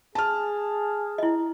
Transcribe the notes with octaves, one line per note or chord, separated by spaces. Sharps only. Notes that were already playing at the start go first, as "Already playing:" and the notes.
G#4 A5 F6
E4 D#5